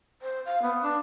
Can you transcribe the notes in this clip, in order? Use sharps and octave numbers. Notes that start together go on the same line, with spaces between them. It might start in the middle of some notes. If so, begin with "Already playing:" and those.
C5
F5
B3
D4